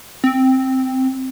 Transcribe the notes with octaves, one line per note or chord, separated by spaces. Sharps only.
C4